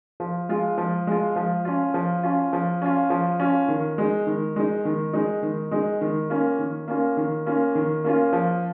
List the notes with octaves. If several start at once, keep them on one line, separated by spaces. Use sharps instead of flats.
F3
G#3 F4
F3
G#3 F4
F3
C#4 F4
F3
C#4 F4
F3
C#4 F4
F3
C#4 F4
D#3
G#3 D#4
D#3
G#3 D#4
D#3
G#3 D#4
D#3
G#3 D#4
D#3
A#3 C#4 F4
D#3
A#3 C#4 F4
D#3
A#3 C#4 F4
D#3
A#3 C#4 F4
F3